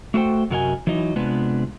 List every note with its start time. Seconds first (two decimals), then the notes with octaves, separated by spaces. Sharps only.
0.14 A3 F#4 A4 C5 G5
0.50 F#2 C3 F#4 A#4 D#5 G#5
0.87 E3 F#3 D#4 D#5
1.16 C3 G#3 B3 D4 F4 B4